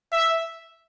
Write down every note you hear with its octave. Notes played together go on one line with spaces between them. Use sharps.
E5